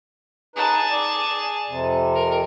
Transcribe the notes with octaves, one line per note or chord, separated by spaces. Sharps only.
D#4 G#4 B4 A5
D5
F2 C3
A#4